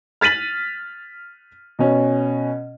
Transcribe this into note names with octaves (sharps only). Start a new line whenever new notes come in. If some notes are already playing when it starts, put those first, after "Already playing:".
F6 A6 B6 D#7 F#7
B2 C#4